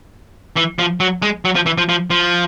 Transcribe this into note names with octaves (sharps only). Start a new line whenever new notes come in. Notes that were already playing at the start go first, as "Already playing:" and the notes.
E3
F3
F#3
G#3
F#3
F3
E3
F3
F3
F3